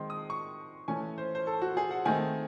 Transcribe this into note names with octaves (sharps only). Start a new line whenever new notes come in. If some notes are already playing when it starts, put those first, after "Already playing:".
Already playing: D#3 G#3 C4 C6
D#6
C#6
E3 A3 C#4 G#5
C5
C5
A4
F#4
G#4
F#5
D#3 A3 C4 G#5